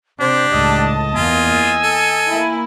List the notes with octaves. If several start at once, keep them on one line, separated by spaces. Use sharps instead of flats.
C3 D4 G4 C5
C#2 A2 D#5 A5
E2 A#3 F4 G#5
E6
A4
A#3 E4